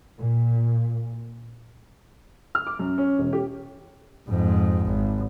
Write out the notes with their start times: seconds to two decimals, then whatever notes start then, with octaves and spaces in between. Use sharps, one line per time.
0.19 A#2
2.55 F6
2.67 D6
2.79 F#2
2.98 C#4
3.18 E1
3.33 G4
4.28 F2 G#2
4.85 G#1